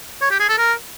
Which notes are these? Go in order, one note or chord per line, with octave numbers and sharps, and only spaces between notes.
C#5
G4
G#4
A4
A#4